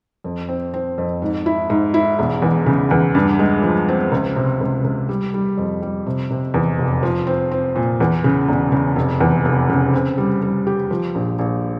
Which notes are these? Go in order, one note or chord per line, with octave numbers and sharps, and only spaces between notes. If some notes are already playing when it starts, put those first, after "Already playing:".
F2
C4
C4
F2
G#2
E4
G#2
E4
E1
E2
C#3
E2
G2
G#3
F3
C4
C#2
C3
C#2
C#2
G3
G3
F2
G3
C3
C3
E2
F1
F3
C4
C4
A#2
E2
C#3
E1
C#3
F1
E2
F1
C#3
C4
G3
G3
G4
F3
A#1
A#1